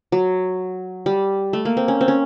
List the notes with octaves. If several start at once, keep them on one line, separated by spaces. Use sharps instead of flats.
F#3
G3
A3
A#3
C4
C#4
C4
C#4